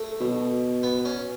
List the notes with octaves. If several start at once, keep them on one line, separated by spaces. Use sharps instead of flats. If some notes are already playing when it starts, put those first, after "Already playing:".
Already playing: A3
B2
B3
C#4